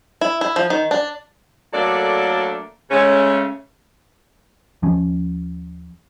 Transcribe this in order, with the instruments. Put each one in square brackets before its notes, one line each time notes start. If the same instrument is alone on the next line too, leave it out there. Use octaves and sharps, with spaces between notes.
[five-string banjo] E4
E4
F3
D#3
D4
[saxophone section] F#3 A3 A#3 D4 A4 D5
C#3 G#3 A3 C#4
[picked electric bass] D#2 F3 C#4